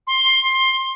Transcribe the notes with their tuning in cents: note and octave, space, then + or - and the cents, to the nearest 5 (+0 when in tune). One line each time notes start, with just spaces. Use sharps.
C6 +15